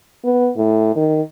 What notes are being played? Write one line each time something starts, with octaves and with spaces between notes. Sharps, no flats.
B3
A2
D#3